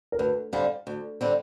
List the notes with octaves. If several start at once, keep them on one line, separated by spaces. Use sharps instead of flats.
A#4
D2 B4
D3 G3 C4 F5
D2
D3 G3 C4